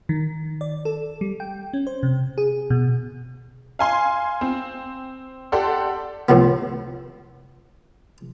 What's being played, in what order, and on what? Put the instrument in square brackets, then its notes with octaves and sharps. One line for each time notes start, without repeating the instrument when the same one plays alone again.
[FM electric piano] D#3
D5
A4
G3
G5
C#4
C5
C3
G#4
B2
[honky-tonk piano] F5 G#5 C6
C4
G4 A4 D5 F#5 C6
[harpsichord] C2 A2 C3 F3 B3